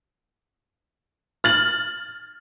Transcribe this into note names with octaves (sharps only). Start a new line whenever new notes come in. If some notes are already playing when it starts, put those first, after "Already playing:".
F6 A6 F#7